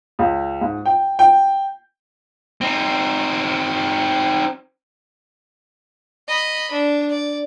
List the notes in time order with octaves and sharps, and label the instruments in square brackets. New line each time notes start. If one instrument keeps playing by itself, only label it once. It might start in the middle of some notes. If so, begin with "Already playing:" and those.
[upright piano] C#2
G#2
G5
G5
[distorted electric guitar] C4 D#4
[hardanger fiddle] D#5 B5
D4
D5